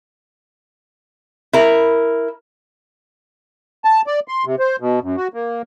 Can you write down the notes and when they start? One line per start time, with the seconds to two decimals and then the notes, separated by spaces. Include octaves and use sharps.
1.53 E4 A#4
3.85 A5
4.07 D5
4.28 C6
4.45 C3
4.59 C5
4.80 B2
5.03 F#2
5.17 F#4
5.34 A#3